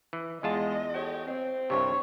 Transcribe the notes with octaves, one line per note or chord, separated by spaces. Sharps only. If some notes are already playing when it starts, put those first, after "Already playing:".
E3
E2 G#3 F4 D#5 A5
G4 A4 C#5
C4
C2 G2 C3 C#5